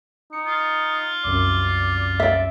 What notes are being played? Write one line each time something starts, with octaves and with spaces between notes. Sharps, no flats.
D#4 C#7
F4
C2 F#2 D5
D5 E5